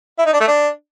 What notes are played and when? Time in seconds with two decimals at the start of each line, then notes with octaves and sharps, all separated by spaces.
0.18 E4
0.26 D#4
0.33 D4
0.40 A3
0.48 D4